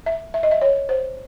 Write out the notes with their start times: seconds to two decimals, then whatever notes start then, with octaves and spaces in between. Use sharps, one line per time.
0.06 E5
0.34 E5
0.43 D#5
0.51 E5
0.61 C#5
0.89 C5